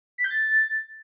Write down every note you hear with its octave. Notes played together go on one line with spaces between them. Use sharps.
B6
G6
A6